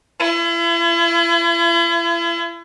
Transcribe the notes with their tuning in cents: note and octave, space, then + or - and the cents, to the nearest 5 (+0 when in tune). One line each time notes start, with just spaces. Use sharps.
E4 +40